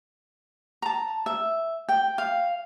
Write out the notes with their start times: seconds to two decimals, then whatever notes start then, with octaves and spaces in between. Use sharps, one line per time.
0.82 A5 A#5
1.26 E5
1.89 G5
2.18 F5